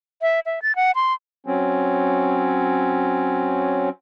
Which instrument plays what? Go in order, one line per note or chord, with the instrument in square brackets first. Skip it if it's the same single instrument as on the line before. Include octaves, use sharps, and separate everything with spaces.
[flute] E5
E5
A6
F#5
C6
[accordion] F#3 C4 C#4